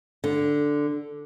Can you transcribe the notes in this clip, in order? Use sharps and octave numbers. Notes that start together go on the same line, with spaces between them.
D3